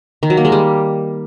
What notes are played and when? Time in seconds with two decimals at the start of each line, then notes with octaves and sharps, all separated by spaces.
0.23 D#3
0.30 F#3
0.37 A#3
0.45 G#3
0.52 G3